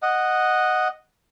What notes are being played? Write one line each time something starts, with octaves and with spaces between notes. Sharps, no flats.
D#5 F#5